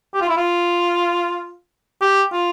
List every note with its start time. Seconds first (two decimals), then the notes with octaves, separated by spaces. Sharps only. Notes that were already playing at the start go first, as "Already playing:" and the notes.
0.14 G4
0.21 F4
0.29 E4
0.37 F4
2.01 G4
2.32 F4